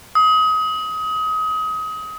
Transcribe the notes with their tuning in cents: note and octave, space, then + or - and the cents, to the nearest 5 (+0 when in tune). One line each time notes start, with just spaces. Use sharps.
D#6 +30